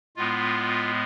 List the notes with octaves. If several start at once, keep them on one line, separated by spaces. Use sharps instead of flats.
A2 G#3 B3 F4